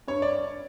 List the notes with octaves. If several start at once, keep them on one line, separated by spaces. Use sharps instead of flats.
G2 C#5
D5